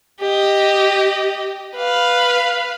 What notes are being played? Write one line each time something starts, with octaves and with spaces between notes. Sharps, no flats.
G4 D#5
B4 F5